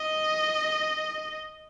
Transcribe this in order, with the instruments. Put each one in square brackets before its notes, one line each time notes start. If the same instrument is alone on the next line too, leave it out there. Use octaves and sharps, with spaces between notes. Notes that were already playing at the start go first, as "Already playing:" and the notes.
Already playing: [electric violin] D#5